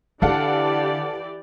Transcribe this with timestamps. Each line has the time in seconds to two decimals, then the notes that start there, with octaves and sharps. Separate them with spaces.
0.22 D3 E3 G4 A4 D5 F5 F#5